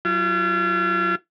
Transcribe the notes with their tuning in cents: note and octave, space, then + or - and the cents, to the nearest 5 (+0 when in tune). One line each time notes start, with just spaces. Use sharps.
F#3 +0 F4 -40